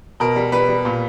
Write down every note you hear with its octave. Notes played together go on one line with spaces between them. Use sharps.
B2 A#4
G3
G3 B4
G3
A#2